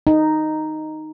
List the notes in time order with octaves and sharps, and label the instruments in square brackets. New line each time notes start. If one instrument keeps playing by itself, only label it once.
[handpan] D#4